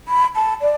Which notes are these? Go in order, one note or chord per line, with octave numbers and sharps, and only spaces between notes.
B5
A5
D5